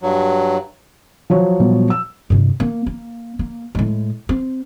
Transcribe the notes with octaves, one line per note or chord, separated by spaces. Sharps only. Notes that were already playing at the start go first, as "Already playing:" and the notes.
G2 F#3
F3 F#3 C#5
A#2 G3 B3
E6
G2 C3
A#3
A#3
A#3
A2 G#3
C4